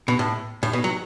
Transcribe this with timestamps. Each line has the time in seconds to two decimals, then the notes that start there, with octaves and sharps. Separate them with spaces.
0.08 B2
0.19 A2
0.63 A2
0.73 B2
0.84 F#3